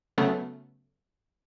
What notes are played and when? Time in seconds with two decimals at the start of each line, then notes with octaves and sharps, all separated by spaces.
0.18 C#3 F#3 A3 B3 C#4